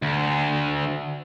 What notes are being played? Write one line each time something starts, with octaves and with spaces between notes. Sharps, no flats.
D2